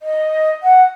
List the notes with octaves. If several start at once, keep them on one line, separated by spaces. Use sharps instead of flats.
D#5
F#5